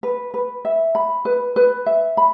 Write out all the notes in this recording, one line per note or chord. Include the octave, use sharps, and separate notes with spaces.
B4
B4
E5
B5
B4
B4
E5
B5